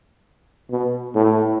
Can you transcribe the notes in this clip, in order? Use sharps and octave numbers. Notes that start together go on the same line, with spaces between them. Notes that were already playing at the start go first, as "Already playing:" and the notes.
B2
A2